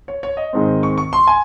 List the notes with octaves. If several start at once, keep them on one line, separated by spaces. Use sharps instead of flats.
C#5
C#5
D#5
G#2 D#3 G#3 C4
C#6
C#6
C6
G#5